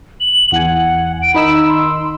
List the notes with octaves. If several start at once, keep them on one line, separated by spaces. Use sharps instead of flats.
F#7
E2 F#5 G#5
D7
D#3 D#4 B5 E6
C6